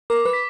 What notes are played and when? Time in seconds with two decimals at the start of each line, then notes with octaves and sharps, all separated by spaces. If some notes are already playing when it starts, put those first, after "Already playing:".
0.10 A#4 D6
0.25 B4
0.33 B6